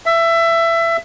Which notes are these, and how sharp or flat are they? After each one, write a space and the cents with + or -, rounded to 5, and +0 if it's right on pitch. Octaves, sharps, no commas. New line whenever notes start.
E5 +20